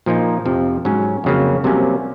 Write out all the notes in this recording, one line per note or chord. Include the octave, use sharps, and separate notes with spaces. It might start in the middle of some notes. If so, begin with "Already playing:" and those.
A#2 F3 A#3 D#4
F2 C3 F3
G#2 F#3 C#4
F2 C#3 F#3 A#3
C2 C3 F#3 A#3 C#4